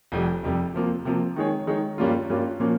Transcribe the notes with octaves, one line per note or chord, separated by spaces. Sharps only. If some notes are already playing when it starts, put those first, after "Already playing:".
F1 F2 C3 G3
F1 F2 C3 G3
C3 F3 A#3
C3 F3 A#3
D#3 G#3 D#4 G#4 C#5
D#3 G#3 D#4 G#4 C#5
G2 G3 A#3 C#4 F4
G2 G3 A#3 C#4 F4
A#2 F3 A#3 C#4